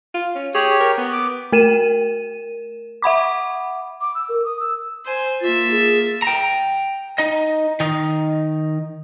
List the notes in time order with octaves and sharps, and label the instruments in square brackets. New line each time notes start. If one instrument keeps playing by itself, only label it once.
[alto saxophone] F4
C#4
[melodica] G4 C#5 [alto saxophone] G#4
[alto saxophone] A#4
B3
[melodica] D6
[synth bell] A3 A#4 D#7 E7
E5 F#5 B5 D6
[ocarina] D6
E6
A#4
D#6
E6
[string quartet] C5 G#5
[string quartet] A#3 E5 A6 [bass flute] F4
[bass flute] G#4
[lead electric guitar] G5 A#5
D#4 D#5
D#3 D#4